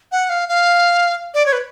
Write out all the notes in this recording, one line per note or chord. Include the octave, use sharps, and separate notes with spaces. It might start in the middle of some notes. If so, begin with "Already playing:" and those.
F#5
F5
F5
D5
C#5
B4